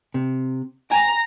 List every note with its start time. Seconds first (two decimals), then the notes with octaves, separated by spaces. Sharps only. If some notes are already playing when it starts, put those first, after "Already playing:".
0.14 C3
0.91 G5 G#5 A#5